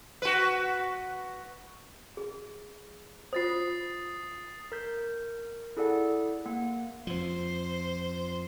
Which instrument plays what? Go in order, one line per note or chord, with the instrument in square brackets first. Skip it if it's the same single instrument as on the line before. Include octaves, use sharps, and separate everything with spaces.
[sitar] F#4 B4
[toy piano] G#4
[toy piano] F4 C5 [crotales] D#6 A6 C7
[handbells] A#4 G6
E4 G#4 A4 D5 F#5
A#3 F#5
[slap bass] F2 F3 [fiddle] C5